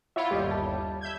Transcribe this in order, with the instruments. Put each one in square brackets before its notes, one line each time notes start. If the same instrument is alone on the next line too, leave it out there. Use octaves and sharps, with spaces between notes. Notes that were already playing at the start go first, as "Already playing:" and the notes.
[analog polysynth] E4 F4 C#5 [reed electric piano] E5 F#5 B5
[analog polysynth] G1 D#2 G3 [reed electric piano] G4 C#5 D#5
[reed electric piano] A5
[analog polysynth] E5 G6 G#6